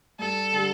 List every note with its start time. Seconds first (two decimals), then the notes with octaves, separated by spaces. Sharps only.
0.19 G2 A4
0.53 D3 G3